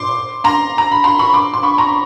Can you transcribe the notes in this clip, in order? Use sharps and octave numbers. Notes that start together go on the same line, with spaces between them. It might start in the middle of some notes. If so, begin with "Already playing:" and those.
Already playing: C6 D6
A#5 C6
A#5
B5
A#5 C6
B5 C#6
C6 D6
C6
B5 C#6
A#5 C6